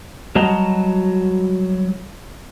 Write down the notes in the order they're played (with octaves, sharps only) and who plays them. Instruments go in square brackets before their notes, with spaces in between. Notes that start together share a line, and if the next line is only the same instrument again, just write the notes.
[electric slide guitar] F#3 G3 F#4 D#5 A5 A#5